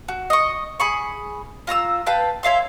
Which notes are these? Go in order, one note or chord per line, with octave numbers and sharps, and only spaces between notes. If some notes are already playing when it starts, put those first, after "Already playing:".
F#4
D#5 C#6
G#4 B5 C#6
F4 A#5 C6 E6
B4 F5 G5 A5
C#5 E5 F5 C6